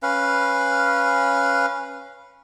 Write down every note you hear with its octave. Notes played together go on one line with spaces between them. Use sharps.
C#4 B4 F5